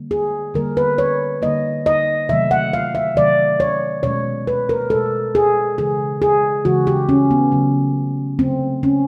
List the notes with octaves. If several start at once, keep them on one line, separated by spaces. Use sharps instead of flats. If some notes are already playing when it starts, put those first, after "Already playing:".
Already playing: D3 G3 A#3
G#4
D3 G3 A#3 A#4
B4
C#5
D3 G3 A#3 D#5
D#5
C3 D#3 F#3 A3 E5
F#5
F5
E5
C3 D#3 F#3 A3 D5
C#5
B2 G#3 C#5
B4
A#4
B2 G#3 A4
G#4
C#3 E3 G#3 G#4
G#4
C#3 E3 G#3 F#4
G4
C#4
B3
C#3 F#3 A3
C#3 F#3 A3 C4
C#4